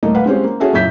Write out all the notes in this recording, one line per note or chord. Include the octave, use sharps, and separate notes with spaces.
D#1 A3 A#3 D#5
B4 F5 F#5
G#3 C4 C#4 G4
A#3
A#3 C#4 F#4 G#4 A4 E5
F#1 F#2 A#2 E5 G6 B6